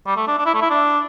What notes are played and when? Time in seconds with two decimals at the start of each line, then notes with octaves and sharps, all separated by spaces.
0.06 G3
0.16 A3
0.27 D4
0.38 D4
0.46 E4
0.54 A3
0.62 E4
0.70 D4